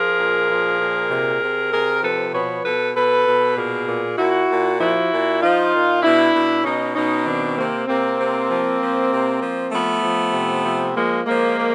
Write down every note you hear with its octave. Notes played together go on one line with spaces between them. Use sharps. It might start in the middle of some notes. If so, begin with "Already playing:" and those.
Already playing: F3 G#4 A#4
A#2
F3
A#2
C3
C3
C3 G#4 A#4
F3 A4 B4
B2 B4 C#5
B2 A4 B4
B2 A4 B4
B2
A#2 G#4 A#4
A#2
A#2 E4 F#4
A#2
F3 E4 F#4
A#2
F3 D#4 F4
A#2
B2 D4 E4
B2
B2 C#4 D#4
B2 C#4 D#4
D#3 C4 D4
C3 A#3 C4
C3 A#3 C4
C3
F3
F3
C3
F3
F3 A3 B3
F3
C3
F3
F3 G#3 A#3
F3 G#3 A#3
F3